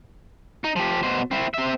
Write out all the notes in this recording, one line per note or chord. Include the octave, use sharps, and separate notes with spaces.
D#4
F3 G4
B2 C5
C4 E4
C4 E5